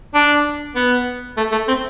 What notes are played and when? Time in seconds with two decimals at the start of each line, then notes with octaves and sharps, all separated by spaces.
0.14 D4
0.75 B3
1.37 A3
1.52 A3
1.68 C4